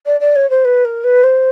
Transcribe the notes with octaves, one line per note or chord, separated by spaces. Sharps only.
D5
D5
C#5
C5
B4
A#4
B4
C5